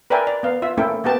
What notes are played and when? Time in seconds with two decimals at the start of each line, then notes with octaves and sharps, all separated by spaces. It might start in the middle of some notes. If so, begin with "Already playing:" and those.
0.10 A#4 B4 D5 E5 G5 G#5
0.27 D5
0.43 B3 F5
0.62 F4 E5
0.77 A3 A#3 C#4 E4 A4 G5
1.04 A#3 B3 G4 A5